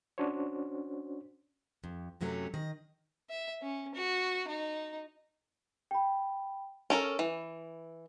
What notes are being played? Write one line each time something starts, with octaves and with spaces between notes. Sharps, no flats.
C#4 D4 F#4 C5 C#5
F2
F#2 C3 F#3 A3 C#4
D#3 D#5
E5
C#4
F#4
D#4
G5 B5
C#4 A4 A#4 D7
E3